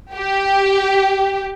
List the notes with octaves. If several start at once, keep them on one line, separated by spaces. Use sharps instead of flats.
G4